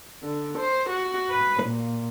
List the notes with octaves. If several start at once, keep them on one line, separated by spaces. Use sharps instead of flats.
D3
C5
F#4
B4
A#2